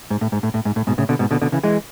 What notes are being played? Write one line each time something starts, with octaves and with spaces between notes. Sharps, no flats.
G#2
A2
G#2
A2
A2
G#2
A2
G#2 B2
A2 C#3
B2 D3
G#2 B2
B2 D3
B2 D3
C#3 E3
E3 G#3